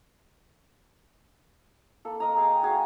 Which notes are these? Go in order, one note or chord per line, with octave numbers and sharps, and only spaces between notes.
A#3 A4
A#4 D#5 A#5
G#4 F5 G5
F#4 G#4 F5